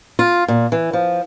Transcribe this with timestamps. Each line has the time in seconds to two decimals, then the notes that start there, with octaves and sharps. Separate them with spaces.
0.19 F4
0.48 A#2
0.72 E3
0.93 F3